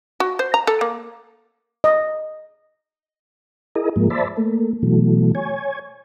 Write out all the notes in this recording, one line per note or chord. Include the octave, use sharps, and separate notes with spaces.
F#4
C5
A#5
A4
A#3
D#5
E4 G#4 A#4 D#5
G#2 F3 G#3 A#3
C5 D5 E5 A5 B5
A3 A#3
B2 E3 F#3 A3
C#5 G#5